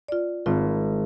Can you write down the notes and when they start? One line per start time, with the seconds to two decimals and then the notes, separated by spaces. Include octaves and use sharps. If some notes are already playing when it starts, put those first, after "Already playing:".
0.08 F4 D5
0.46 G#1 C4 F4